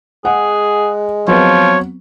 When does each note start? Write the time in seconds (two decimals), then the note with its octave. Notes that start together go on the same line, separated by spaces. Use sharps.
0.25 G#3 G#4 F#5
1.28 F3 F#3 B3 C4 C#5